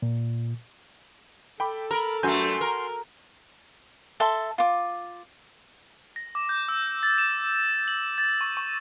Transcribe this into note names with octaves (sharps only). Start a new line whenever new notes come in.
A#2
A4 G5 B5 D6
A#4 A#5 B5
F#2 A3 F#4 G#5 C6 G6
A#4
A4 E5 A5 C6
F4 D6
A#6
D6
G6
E6
A6
E7
F#7
A6
C#6
C#6